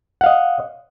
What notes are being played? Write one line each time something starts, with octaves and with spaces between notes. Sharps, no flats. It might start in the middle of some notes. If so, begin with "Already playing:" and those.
D#5 F5 F#5